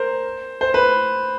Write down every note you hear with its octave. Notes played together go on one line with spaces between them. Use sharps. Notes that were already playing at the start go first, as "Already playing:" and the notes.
Already playing: A#4 C5
C5
B4